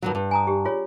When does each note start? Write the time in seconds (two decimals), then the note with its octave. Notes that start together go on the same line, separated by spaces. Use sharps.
0.02 G2 D#3 F#3
0.15 G2
0.31 G#5 A#5 D#6
0.47 G4
0.65 F4 G#4 C#5